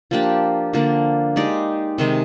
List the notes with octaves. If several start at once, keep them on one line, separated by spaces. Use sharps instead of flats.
F3 A#3 D4 G4
D3 F3 A#3 D4
G#3 D#4 G4 D5
C3 D#3 G#3